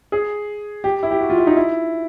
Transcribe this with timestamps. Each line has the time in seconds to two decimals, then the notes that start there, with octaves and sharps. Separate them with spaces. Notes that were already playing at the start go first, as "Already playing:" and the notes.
0.12 G#4
0.84 G4
1.03 E4
1.11 G4
1.21 F#4
1.30 F4
1.38 E4
1.47 D#4
1.57 E4